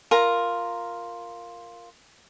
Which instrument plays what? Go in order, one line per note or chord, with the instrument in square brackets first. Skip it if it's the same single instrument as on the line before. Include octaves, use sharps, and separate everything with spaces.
[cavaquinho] F4 A#4 A#5